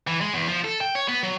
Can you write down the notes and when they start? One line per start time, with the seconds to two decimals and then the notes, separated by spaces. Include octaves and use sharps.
0.07 E3
0.21 G#3
0.34 E2
0.47 F3
0.64 A4
0.81 G5
0.95 C#5
1.08 B3
1.23 F#3